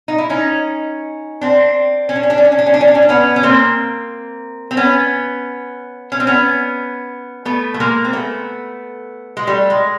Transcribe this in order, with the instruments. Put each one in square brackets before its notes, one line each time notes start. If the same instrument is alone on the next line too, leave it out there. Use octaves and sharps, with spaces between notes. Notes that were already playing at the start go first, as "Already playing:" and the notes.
[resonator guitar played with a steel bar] D#4
E4
C#4 D#4
C4 D4
C#4
D4
C#4
D4
C#4
D4
C#4
D4
C#4
D4
C#4
D4
C#4
D4
B3 C#4
C#4
A#3 C4
C4
B3 C#4
C#4
C4
B3 C#4
A3 B3
A3
G#3 A#3
C4
A3 B3
G#3
G3 A3
G#3